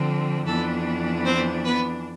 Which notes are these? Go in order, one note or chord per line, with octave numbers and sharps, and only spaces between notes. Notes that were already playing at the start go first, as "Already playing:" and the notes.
Already playing: D3 F3 C4
F2 E3 B3 D4 A4
C4 C5
B3 B4